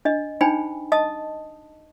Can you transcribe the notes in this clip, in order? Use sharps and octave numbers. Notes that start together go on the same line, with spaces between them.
D4 D#5
D4 D#4 C5 G5 G#5 B5
D#5 A5 D#6